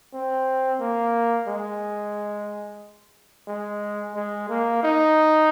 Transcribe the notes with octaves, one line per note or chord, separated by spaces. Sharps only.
C4
A#3
G#3
G#3
G#3
A#3
D#4